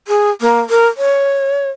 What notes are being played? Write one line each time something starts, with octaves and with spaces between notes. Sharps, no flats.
G#4
A#3
A#4
C#5